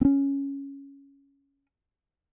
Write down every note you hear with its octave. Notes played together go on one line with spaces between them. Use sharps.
C4 C#4